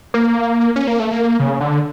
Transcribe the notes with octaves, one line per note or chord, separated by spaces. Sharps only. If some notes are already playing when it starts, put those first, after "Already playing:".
A#3
C#4
A#3
A3
A#3
C#3
D3